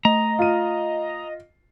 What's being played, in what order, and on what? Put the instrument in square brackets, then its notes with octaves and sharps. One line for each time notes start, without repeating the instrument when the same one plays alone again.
[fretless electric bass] A3 [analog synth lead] D#5 [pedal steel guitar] A#5
[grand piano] F4 D#7